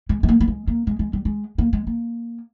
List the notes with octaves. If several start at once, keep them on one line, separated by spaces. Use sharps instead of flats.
G#3
G#3
A#3
A#3
G#3
A#3
G#3
G#3
G3
G#3
A#3
G#3
A#3